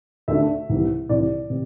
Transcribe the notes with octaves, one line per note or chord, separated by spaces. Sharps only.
D2 D3 A3 D4 E5
C2 C3 E3
C2 C3 E3 D5
C3